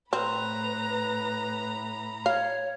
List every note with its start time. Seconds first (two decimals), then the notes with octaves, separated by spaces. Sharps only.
0.13 A2 C4 B4 A#5 B5
2.26 C#5 F5